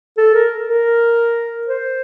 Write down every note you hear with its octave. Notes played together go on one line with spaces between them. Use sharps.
A4
A#4
A#4
C5